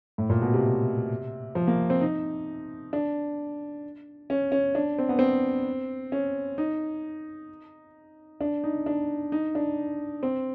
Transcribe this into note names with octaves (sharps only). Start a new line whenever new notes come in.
A2
A#2
B2
C3
F3
A#3
C4
D#4
D4
C#4
C#4
D4
C4
B3
C4
C#4
D#4
D4
D#4
D4
D#4
D4
C4